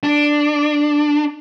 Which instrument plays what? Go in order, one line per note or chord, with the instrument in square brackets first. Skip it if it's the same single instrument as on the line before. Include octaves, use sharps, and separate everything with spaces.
[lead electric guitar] D4